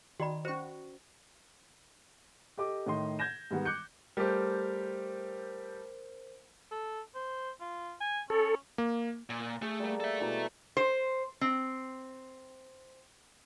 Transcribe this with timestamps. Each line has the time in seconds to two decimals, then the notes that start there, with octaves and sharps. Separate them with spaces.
0.20 D#3 F#4 D5 B5
0.45 C#4 F#4 C5 C#6
2.58 G4 A4 D#5 D6
2.86 A2 D#3 D#5 C6
3.19 G6 G#6 A#6 E7
3.51 G#2 D#3 G3 G#3 B3
3.65 D6 F#6 G6 C#7
4.17 G3 A3 G4 A#4 C5
6.71 A4
7.15 C5
7.60 F4
8.01 G#5
8.30 C#4 A4
8.78 A#3
9.30 A#2
9.62 A3 G#4
9.79 G3 A#3
10.00 A4 E5
10.20 B2 E3 A#3
10.77 C5
11.41 C4